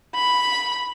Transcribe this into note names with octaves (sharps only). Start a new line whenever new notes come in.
B5